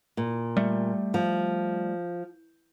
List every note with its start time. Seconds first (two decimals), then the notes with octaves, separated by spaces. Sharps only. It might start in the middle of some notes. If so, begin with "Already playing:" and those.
0.17 A#2
0.57 G3 A3
1.14 F3